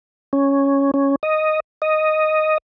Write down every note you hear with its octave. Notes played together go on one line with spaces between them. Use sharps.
C#4
C#4
D#5
D#5